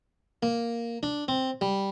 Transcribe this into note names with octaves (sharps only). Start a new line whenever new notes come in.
A#3
D4
C4
G3